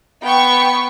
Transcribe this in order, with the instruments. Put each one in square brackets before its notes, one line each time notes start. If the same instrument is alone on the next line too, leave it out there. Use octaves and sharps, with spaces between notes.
[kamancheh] B3 [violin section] G5 C#6